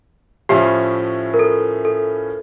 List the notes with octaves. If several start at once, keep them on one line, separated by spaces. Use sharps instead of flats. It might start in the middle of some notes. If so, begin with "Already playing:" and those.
A2 F3 C#4 E4 G4
A#4
A4
A4